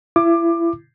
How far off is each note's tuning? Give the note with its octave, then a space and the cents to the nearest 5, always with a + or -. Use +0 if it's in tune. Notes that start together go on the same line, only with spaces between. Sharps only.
E4 +30 D6 +20